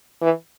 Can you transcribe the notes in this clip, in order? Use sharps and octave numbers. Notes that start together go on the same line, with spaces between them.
E3